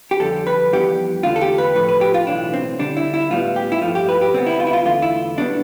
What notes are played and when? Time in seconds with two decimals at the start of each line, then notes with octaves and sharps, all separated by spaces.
0.11 G4
0.20 F2 D3 G3 A4
0.47 B4
0.72 F2 E3 G3 B3 G4
1.23 E2 D3 A3 F4
1.36 A4
1.41 G4
1.58 B4
1.75 A2 F3 A3 B4
1.89 B4
2.01 G4
2.14 F4
2.27 B1 A2 E3 D4
2.54 C4
2.79 D2 D3 G3 D4
2.97 E4
3.14 E4
3.30 A2 G3 B3 F4
3.56 G4
3.72 E4
3.82 G2 F3 A3 F4
3.95 G4
4.09 B4
4.21 G4
4.33 D2 C3 G3 B3 C4
4.46 E4
4.60 F4
4.67 E4
4.73 F4
4.85 E2 D3 A3 F4
5.02 E4
5.37 B1 B2 G3 B3 D4